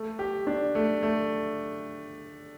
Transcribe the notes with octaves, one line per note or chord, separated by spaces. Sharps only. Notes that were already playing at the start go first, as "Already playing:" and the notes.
Already playing: A3
G4
D4
A3
A3